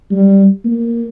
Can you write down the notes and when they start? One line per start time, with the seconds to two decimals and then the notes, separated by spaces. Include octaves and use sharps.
0.11 G3
0.65 A#3